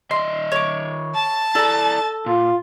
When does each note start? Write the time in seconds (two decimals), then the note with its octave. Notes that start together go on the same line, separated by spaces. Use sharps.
0.11 D#3 D#5 E5 C6
0.52 C#5 D6
1.14 A5
1.55 E4 A4 D5 A#5
2.26 A#2 F4